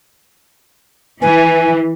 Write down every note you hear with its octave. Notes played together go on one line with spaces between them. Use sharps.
E3 B4 G#5